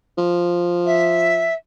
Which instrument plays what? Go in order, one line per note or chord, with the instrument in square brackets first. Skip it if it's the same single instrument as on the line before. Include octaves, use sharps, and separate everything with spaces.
[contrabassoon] F3
[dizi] E5